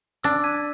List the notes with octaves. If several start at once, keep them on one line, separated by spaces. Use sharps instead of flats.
D4 E6
G#6 B6 D#7